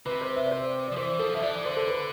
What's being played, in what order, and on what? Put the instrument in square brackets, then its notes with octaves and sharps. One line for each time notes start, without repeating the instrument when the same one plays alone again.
[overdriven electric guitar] C3 [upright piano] B4
[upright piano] C5
E5
D5
C5
D5
[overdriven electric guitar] F3
[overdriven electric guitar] E3 [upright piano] C5
[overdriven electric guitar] F3 [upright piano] A4
[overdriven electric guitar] D3 [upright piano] E5
[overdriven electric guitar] E3 [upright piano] D5
[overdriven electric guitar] D3 [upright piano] C5
[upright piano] A4
B4